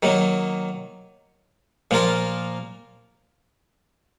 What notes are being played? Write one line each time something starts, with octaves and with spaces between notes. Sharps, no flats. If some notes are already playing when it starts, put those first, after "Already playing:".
D#3 F#3 A#3
A#2 F3 A#3 F4 A#4